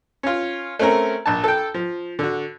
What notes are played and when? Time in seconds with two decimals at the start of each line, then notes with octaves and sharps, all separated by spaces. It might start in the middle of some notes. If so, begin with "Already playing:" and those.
0.23 C#4 F4
0.79 A3 C4 C#4 A#4
1.26 A#1 A5
1.44 A4 G5
1.74 F3
2.19 D3 F#4